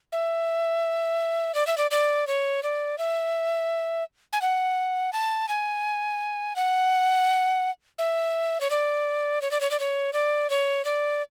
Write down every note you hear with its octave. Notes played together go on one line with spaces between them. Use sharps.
E5
D5
E5
D5
D5
C#5
D5
E5
G#5
F#5
A5
G#5
F#5
E5
C#5
D5
C#5
D5
C#5
D5
C#5
D5
C#5
D5